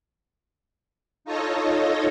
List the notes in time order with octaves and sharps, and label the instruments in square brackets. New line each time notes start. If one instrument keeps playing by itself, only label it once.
[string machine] D#4 F4 A4 C#5 D#5